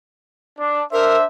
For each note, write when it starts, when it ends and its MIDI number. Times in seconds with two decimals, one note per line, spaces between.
0.59 0.82 62
0.93 1.25 62
0.93 1.17 70
0.93 1.25 72
0.93 1.25 76